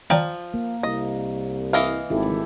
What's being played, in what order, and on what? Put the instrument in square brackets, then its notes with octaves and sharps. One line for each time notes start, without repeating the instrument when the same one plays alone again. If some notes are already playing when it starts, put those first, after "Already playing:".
[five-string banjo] F3 [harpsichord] D5 G5 A#5
[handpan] A#3
[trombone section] C2 [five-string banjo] D#5
[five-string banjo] E3 D#5 F5
[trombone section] G#1 [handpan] E4 G4 A4